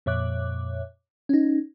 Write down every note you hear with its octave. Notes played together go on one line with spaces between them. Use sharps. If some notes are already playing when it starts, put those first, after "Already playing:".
F2 A#2 C#5 E5 D6 F#6
C#4 D#4